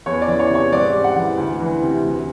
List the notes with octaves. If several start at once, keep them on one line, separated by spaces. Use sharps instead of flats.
E2 C#5
D5
E3
C#5
C3 C#5
G#2 D5
G3
F#5
E3
D2
E3
C3
D2